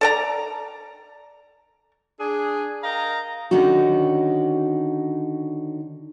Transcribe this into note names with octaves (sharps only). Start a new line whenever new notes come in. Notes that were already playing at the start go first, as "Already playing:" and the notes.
A4 D5 A#5
D4 G#4
A#4 D#5 F5 G5 A#5
D3 D#3 C#4 D#4 F#4